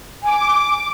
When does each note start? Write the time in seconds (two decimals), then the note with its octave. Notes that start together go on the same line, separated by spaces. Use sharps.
0.23 G#5 D6